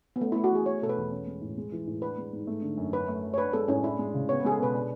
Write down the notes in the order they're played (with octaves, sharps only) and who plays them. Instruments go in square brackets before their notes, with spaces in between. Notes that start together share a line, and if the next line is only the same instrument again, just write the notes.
[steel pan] B3
[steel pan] A3 [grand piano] C#4
[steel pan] E4
[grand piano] A3
[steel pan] F#4
[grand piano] E3 [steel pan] G#4
[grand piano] A3 [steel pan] C#5
[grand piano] B2 [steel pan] A4
[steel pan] B4
[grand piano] E2
C#4
G#3
A2
G#3
E3
A2
[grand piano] D4 [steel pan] B4
[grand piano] G#3
G#2
A3
D3
F#2
[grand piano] C#4 [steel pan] B4
[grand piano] A3
F#3
[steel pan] C#5
[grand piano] D4 [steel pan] B4
[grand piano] G#3 [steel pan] A4
[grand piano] A2 [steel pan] C#4
[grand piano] D4 [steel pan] E4
[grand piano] G#3
C#3
[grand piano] B3 [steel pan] C#5
[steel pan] B4
[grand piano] G#3 [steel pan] G#4
[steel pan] A4
[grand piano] B2 [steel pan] B4
[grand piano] D4